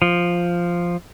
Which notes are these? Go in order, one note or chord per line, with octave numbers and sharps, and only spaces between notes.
F3